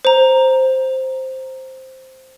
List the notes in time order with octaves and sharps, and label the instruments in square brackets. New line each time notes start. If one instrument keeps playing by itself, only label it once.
[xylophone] C5 A#5